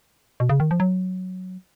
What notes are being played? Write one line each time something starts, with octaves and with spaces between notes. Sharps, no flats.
B2
C#3
D#3
F3
F#3